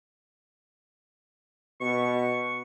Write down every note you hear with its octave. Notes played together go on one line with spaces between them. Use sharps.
B2 C#6